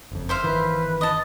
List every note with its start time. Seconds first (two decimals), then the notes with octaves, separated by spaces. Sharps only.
0.12 F#1 F2
0.29 C5 E5 F5
0.44 G1 D#3 E3 B4
1.01 D#5 A5